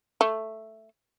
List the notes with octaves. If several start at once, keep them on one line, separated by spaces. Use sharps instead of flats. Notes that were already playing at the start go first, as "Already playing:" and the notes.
A3